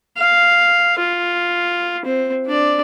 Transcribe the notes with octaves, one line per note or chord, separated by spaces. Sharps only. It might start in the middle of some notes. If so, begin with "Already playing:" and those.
F5
F4
C4
D4 D5